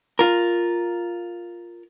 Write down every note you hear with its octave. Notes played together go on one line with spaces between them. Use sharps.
F4 A#4